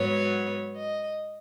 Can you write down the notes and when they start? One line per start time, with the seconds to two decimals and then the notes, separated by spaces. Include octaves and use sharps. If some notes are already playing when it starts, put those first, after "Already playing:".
Already playing: G#2 F#3 B3 C#5
0.76 D#5